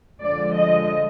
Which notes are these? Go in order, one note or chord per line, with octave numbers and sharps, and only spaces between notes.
D3 F3 G#3 D5
D#5